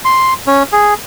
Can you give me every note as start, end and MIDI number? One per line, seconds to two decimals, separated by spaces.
0.05 0.34 84
0.47 0.63 61
0.73 0.94 68